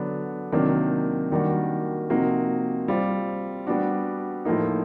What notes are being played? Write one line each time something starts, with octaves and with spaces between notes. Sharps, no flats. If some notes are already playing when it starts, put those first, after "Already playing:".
Already playing: D3 F#3 B3 D4
C3 D#3 F#3 A#3 D4
D#3 G3 A#3 D4 F#4
C3 F3 A#3 D#4 F#4
G3 C4 F4
G3 B3 D4 F#4
A2 F3 A#3 D#4